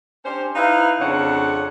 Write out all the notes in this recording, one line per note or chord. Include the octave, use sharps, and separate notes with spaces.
C#4 D4 G4 C5
D#4 E4 B4 F5
F2 C#3 D4 C#5 F#5